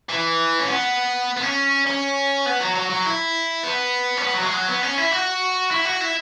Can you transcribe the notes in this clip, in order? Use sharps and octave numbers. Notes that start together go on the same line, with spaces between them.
E3
C#4
B3
B3
C#4
C#4
B3
F#3
F#3
F#3
E4
B3
C#4
B3
F#3
G#3
F#3
B3
C#4
E4
F#4
E4
F#4
E4